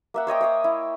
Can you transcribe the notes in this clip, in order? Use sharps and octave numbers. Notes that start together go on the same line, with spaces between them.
A#3 E5 F#5
C5 C#5 D#5 G5
C#5 F5 D#6
E4